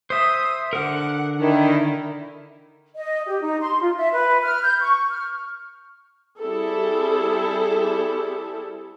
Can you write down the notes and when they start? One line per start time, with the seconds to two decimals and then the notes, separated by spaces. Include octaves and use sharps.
0.10 C5 E5 D#6
0.73 D3 A#4 F#5
1.39 D#3 D4 E4
2.96 D#5
3.28 G4
3.42 D#4
3.61 C6
3.82 F4
3.97 E5
4.13 B4
4.43 F6
4.63 G6
4.80 C#6
5.09 F6
6.38 G3 C4 E4 G#4 A4